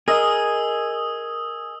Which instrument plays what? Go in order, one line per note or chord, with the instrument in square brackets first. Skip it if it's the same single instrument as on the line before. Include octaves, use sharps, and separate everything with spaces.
[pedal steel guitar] G#4 [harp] A#4 D#5 [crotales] D#6 E6